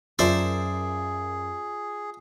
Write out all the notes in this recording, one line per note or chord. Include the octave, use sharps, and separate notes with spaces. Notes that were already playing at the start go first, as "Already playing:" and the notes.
F#2 F4 G#4 A#4 C5 D5 E5 A5